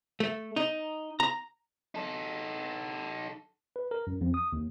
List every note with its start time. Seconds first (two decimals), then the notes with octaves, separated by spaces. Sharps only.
0.20 A3
0.56 D#4
1.20 A#5
1.95 D#4 A4
3.76 B4
3.91 A#4
4.07 F#2
4.21 F2
4.34 D#6
4.53 D#2